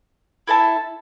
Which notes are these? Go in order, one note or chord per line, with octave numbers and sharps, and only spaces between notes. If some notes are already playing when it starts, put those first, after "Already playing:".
E4 A4 E5 A5